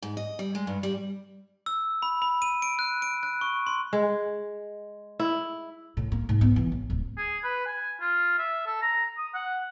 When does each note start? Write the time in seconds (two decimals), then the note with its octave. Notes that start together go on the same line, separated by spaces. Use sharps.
0.02 G#2
0.17 D#5
0.39 G3
0.55 G#3
0.67 G2
0.83 G3
1.66 E6
2.02 B5
2.22 B5
2.42 D#7
2.62 D7
2.79 F#6
3.02 D7
3.23 F#6
3.41 C#6
3.67 C6
3.93 G#3
5.20 E4
5.97 A2
6.12 A#3
6.29 G#2
6.41 B3
6.56 E3
6.72 A1
6.90 D1
7.17 G#4
7.44 B4
7.66 G#5
8.01 F4
8.39 E5
8.66 A4
8.82 A#5
9.17 D#6
9.34 F#5